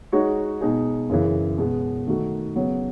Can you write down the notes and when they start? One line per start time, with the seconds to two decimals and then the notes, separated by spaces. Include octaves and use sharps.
0.12 G#3 D#4 F#4 C#5
0.61 B2 G#3 D#4 G#4
1.09 F#2 C#3 E3
1.58 B2 G#3 B3
2.07 D#3 A3 D#4 F#4
2.56 C#3 F#3 B3